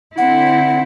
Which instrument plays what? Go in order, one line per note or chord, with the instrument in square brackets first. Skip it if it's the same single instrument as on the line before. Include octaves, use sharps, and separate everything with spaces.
[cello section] D3 C4 E4 [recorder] F#5